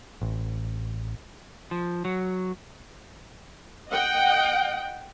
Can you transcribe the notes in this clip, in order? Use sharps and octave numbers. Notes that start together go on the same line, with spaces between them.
A1
F3
F#3
D#5 F#5 G5